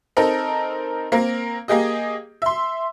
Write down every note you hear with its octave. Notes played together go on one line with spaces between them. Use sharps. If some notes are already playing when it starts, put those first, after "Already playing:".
C4 D#4 A4 A#4 A#5
A#3 C4 A#4
A#3 G4 G#4 D#5
E5 C6